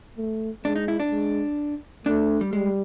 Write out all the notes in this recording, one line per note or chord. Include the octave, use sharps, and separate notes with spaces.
A3
G#3 D4
D#4
E4
D4
G#3
A3 D4
G3
G3 G#3